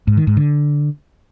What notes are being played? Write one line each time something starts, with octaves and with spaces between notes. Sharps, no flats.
G#2
D#3
G#2
D3